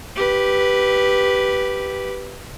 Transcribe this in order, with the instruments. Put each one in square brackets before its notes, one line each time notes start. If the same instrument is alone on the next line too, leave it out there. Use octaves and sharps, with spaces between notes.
[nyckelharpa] G4 B4